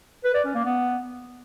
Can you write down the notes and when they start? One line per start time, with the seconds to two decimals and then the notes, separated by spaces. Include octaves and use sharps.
0.24 B4
0.34 D5
0.44 C#4
0.55 A#3
0.65 B3